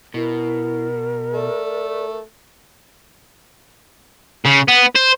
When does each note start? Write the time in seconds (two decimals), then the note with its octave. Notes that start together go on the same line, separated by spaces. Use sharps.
0.14 B2 E4 A#4
1.34 A3 D5
4.45 C#3
4.68 B3
4.96 C5